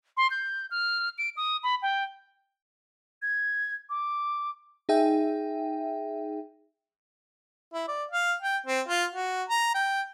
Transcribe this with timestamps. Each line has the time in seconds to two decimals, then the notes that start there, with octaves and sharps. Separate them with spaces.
0.17 C6
0.31 G6
0.71 F6
1.18 D7
1.37 D#6
1.63 B5
1.82 G5
3.22 G#6
3.90 D6
4.89 D#4 G#4 E5 G5
7.74 E4
7.88 D5
8.11 F5
8.42 G5
8.66 C4
8.88 F4
9.12 F#4
9.49 A#5
9.74 G5